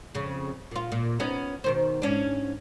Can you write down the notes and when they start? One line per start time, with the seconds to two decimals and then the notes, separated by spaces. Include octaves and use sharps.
0.15 F2 C#3
0.71 A#2 F4
0.92 A#2
1.20 B3 C#4 D#4
1.64 B2 D#3 C5
2.02 G#2 C#4 D4